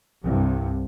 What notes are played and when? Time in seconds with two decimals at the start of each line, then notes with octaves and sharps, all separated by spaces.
0.24 C2 G2 C3